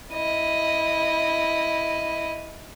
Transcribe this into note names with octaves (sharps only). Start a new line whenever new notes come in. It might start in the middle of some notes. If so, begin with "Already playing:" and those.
E4 D#5